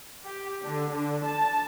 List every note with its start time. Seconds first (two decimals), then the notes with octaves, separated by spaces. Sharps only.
0.25 G4
0.64 D3
0.92 D3
1.25 A5